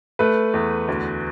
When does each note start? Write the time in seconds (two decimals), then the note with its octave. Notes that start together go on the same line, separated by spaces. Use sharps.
0.19 A3 B4
0.54 E2
0.88 D2